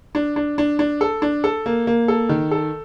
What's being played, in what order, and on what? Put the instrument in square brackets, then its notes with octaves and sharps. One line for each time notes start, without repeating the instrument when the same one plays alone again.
[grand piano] D4
D4
D4
D4
A4
D4
A4
A#3
A#3
A4
D#3
A4